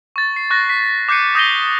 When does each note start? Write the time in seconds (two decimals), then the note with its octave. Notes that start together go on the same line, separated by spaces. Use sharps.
0.16 C#6 A6
0.36 C7
0.50 C#6 F#6 A6 A#6
0.69 B6
1.08 D6 F#6 G6 C7 C#7 D#7
1.35 D#6 G6 A#6 D#7 G7